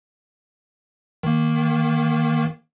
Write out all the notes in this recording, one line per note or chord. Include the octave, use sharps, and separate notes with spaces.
D#3 A#3